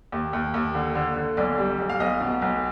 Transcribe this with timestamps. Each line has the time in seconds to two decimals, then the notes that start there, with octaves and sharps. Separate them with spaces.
0.12 D#2
0.33 D#2
0.54 D#2
0.75 D3
0.95 D3
1.16 D3
1.37 B1 D5
1.58 G3
1.79 B1
1.89 F5
2.00 B1 D#5
2.21 B2
2.42 B1